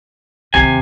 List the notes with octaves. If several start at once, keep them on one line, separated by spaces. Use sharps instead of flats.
D#2 C3 D#3 G#5